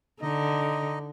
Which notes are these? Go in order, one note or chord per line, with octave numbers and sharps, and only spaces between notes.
D3 D#4 D#5